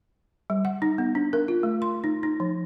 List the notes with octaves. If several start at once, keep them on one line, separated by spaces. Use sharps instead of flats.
G3
F#5
D#4
B3
D4
A#4
F4
A3
C6
D#4
D#4
F3